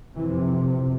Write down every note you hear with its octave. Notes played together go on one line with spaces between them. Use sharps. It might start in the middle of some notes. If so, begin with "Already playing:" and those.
F2 C3 E3